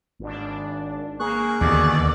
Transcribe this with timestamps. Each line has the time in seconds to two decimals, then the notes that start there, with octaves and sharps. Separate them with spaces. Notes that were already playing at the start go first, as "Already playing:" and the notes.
0.19 G#1 D4
1.20 A#3 G#4 C#6 F#6
1.61 D#2 B2 D3 D#3 D5